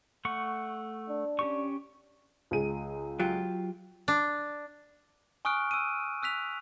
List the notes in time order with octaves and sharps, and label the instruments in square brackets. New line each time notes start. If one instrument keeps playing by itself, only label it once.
[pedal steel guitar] A3 F#5 C#6
[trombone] D4
[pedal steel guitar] C#4 G4 C#6
[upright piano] C#2 G#4 D#7
[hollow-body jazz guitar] F#3 F4 G4
[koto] D4
[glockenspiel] G#5 C#6 D#6 F6 F#6 D7
E6 D#7
E6 F#6 B6 F7